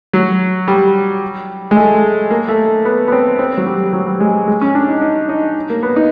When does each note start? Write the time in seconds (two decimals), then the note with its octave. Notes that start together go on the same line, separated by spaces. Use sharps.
0.13 F#3
0.68 G3
1.71 G#3
1.76 A3
2.31 A#3
2.48 A3
2.85 B3
3.08 B3
3.12 C4
3.39 C4
3.57 F#3
3.66 G3
3.93 F#3
4.07 G3
4.20 G#3
4.47 G#3
4.61 C#4
4.75 D4
4.88 D#4
5.02 D#4
5.29 D#4
5.70 A#3
5.83 B3
5.96 D#4